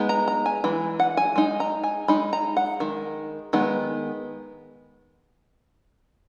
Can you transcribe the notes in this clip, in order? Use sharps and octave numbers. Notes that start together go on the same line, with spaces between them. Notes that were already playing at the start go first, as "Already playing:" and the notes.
Already playing: G#3 B3 D#4
A#5
A#5
G#5
E3 G#3
F#5
G#5
G#3 D#4
A#5
G#5
G#3 D#4 B5
A#5
F#5
D#3 G#3
D#3 G#3 B3